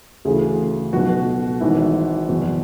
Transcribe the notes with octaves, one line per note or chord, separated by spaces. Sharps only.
D2 C#3 E3 G#4
B1 B2 F#4
G#1 G#2 E3 E4
F#1 E2 B2